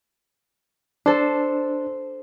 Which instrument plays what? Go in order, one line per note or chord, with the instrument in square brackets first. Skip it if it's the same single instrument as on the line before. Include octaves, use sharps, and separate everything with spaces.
[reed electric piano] D4 [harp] A4 C5